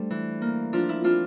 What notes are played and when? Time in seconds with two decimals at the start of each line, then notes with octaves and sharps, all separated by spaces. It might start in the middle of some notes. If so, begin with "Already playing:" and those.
Already playing: G3 A3 D4 A4 C5 D5
0.10 E3
0.41 A#3
0.73 F3 D4 F4
0.89 E4
1.04 C4 D4 F4